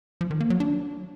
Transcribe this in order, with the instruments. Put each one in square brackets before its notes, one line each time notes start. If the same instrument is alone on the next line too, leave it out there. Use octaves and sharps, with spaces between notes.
[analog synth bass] F3
D#3
A#3
F#3
D4